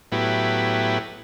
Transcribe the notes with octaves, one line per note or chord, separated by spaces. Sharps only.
A2 F#3 B3 E4 G4